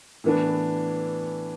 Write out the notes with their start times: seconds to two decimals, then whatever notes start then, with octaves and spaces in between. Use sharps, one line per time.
0.24 A2 E3 B3 D4